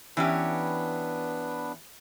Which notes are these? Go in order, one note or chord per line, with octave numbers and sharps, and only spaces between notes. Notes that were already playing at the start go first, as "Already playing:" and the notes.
E3 B3 C#4 D4 G4 B4